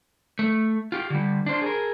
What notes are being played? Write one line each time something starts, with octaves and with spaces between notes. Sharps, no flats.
A3
F4 G4
D3 G3
D4 C5
G#4 A#4